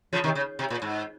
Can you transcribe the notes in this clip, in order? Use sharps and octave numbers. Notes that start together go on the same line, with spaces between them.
C#3 F3
C3 D#3
C#3
C3
A#2
G#2